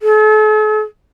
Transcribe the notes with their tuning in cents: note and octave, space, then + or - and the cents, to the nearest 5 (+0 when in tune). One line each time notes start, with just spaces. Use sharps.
A4 -45